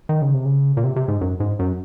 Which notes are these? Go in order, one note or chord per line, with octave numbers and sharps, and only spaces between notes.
D#3
C#3
C3
C#3
A#2
C3
C3
G#2
F#2
G#2
F#2